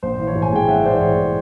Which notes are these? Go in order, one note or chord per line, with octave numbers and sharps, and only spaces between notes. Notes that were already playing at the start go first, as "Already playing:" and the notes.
A#1 C5
E3
C#5
A2
G#5
G#3 G5
A#1 E5 F#5
E3 C5 D5
A2 C#5
G#3